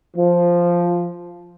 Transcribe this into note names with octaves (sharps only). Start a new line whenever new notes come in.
F3